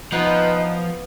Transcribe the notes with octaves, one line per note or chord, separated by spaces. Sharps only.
F3 B3 D#4 B4 D#5